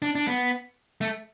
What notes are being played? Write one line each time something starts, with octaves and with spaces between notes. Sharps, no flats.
D4
D4
B3
A3